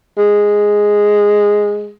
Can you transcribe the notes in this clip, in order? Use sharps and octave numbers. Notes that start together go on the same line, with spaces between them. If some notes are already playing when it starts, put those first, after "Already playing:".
G#3